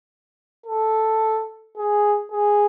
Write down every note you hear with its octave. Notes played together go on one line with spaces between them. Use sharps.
A4
G#4
G#4